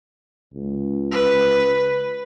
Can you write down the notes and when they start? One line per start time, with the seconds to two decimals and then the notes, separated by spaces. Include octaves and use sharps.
0.54 C#2
1.12 B4